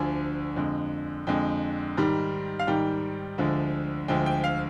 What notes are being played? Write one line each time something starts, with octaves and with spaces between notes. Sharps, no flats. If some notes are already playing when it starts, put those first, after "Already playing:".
Already playing: D2 D3 F3 G#5
F2 D3 G#3
F2 D3 G#3 G5
G#2 D#3 G3
F5
G#2 D#3 G3 G5
D2 D3 F3 G#3
D2 D3 F3 G#3 G5
G5
F5